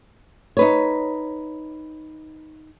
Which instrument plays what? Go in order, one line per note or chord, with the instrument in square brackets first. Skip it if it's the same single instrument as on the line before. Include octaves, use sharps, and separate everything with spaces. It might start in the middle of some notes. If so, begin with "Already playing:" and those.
[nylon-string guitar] D#4 B4 C#5